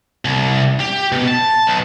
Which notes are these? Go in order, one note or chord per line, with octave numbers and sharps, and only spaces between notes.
C2
G4
B2
A5
B1